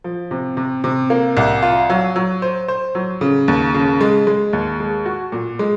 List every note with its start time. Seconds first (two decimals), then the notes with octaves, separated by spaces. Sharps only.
0.04 F3
0.31 C3
0.57 C3
0.84 C3
1.10 A#3
1.37 C2
1.62 F4
1.90 F#3
2.16 F#3
2.42 C5
2.68 C5
2.95 F#3
3.21 C#3
3.48 D#2
3.74 C#3
4.01 G#3
4.27 G#3
4.53 D#2
4.80 G#3
5.06 F#4
5.32 A#2
5.59 G#3